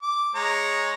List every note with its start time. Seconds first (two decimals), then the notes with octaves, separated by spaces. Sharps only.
0.02 D6
0.35 G#3 C#5 A#5